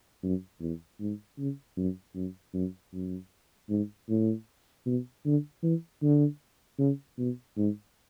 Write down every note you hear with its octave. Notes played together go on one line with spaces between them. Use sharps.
F#2
E2
G#2
C#3
F#2
F#2
F#2
F#2
G#2
A2
B2
D3
E3
D3
C#3
B2
G#2